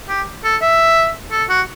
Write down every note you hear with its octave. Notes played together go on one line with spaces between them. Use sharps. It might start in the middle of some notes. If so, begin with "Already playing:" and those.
G4
A4
E5
A4
F#4